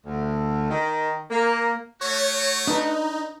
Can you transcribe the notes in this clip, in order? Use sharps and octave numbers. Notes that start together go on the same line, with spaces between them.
D2
D#3
A#3
A3 F#4 C#5
D4 D#4 B4